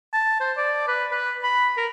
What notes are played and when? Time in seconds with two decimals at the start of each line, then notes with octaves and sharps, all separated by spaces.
0.13 A5
0.40 C5
0.57 D5
0.88 B4
1.11 B4
1.43 B5
1.77 A#4